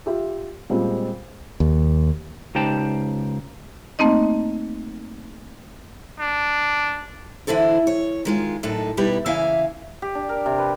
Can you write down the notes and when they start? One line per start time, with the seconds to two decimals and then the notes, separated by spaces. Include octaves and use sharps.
0.06 F4 G4 E5
0.70 A#2 G3 G#3 C4 F4
1.60 D#2
2.55 C#2 D#4 G4 C5 G5 A5
3.99 A3 A#3 C4 D#4 D#5
6.19 D4
7.47 D3 E3 E4 A4 C5
7.87 C#5
8.25 D#3 G#3 F4
8.63 F#2 A2 D4 D#4 A4
8.97 B2 G3 D#4 E4 G4 B4
9.26 C#3 E3 A#3 E5 F5 G#5
10.02 G4
10.15 D4
10.29 A#4
10.46 C3
10.58 B4